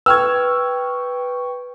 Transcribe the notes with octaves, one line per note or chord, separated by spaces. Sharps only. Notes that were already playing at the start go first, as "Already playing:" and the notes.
B4 G5 C#6 E6 F6 G#6